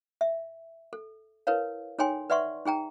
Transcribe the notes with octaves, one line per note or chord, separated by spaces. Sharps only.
E5
A4
E4 A#4 B4 C#5 F5
D#4 A4 C#5 G5 G#5 C6
B4 D5 E5 F#5 C6 C#6
D#4 G#4 G5 A#5